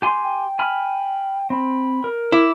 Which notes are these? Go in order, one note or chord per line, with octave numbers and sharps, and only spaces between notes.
G4 G#5 C6
G5
G#5 B5 F6
C4 B5
A#4
E4 D6